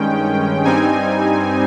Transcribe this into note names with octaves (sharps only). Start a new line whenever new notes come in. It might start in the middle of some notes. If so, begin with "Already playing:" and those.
Already playing: G2 D#3 G#3 C#4 G5
G2 G3 C4 D#4 G#5